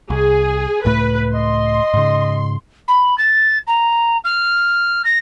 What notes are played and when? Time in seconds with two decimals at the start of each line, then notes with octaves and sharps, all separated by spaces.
0.10 C2 G#4
0.85 C#2 A2 A3 B4
1.35 D#5 C6
1.94 G#2 C#3
2.88 B5
3.18 A6
3.67 A#5
4.24 F6
5.05 A#6